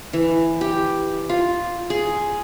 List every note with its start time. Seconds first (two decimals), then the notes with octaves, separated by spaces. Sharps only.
0.13 E3
0.61 G4
1.29 F4
1.90 G#4